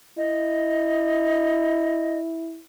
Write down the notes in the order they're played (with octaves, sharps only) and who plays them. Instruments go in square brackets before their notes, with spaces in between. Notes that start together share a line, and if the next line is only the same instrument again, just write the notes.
[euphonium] E4 [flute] D#5